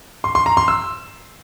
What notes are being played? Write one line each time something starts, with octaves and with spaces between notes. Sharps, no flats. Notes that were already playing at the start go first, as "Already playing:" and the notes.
C6
C6
A#5
C6
E6